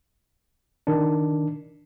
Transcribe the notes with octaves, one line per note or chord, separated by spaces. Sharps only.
D#3 D4